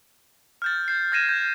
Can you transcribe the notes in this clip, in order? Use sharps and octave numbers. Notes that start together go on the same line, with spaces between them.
F6 G6 A6
G6 C7
F6 G#6 A#6 C7 D#7 E7
G6